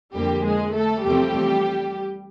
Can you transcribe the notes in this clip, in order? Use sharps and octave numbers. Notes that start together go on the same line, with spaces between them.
F2 D3 F3 G3 A#3 G4
G#3 G#4
A3 A4
E2 C3 F3 G3 A3 C4 G4